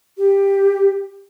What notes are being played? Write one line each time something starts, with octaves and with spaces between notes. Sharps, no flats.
G4